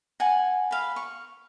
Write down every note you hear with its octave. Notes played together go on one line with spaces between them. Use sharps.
F#5 G#5 A5
B4 F5
C#6